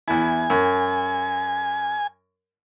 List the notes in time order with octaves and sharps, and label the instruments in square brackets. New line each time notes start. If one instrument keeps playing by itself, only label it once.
[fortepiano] E2 E4 [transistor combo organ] G#5
[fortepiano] F#2